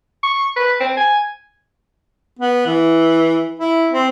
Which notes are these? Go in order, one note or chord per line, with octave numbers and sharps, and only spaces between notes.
C#6
B4
C4
G#5
B3
E3
E4
C4